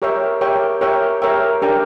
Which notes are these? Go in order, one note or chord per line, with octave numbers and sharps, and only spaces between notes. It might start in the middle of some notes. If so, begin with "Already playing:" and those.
G4 A#4 C#5 E5 G5
G4 A#4 C#5 E5 G5
G4 A#4 C#5 E5 G5
G4 A#4 C#5 E5 G5
D4 G4 A#4 D5 G5